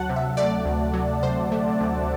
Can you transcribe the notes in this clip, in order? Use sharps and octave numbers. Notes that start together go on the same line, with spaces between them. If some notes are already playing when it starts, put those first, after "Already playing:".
Already playing: D2 F#3 F#5 A5
C3
E5
A3 D5
D2
F#3
C3 C5
A3
D2